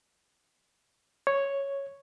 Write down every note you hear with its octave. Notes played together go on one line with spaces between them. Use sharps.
C#5